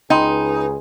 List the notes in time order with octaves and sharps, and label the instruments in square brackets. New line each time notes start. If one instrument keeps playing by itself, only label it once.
[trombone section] C#2 G#4 B4 [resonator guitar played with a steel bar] D#4 [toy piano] G5 B5 C6